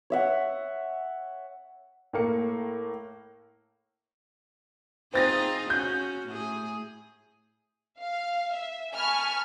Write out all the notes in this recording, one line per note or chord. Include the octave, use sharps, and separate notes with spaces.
C#5 E5 F#5
A2 A#3 C#7
C4 D#4 F4 G#4 A6 A#6
C#4 F#4 G6
A2 G#4
F5
E5
G#5 A5 B5 C#6 F6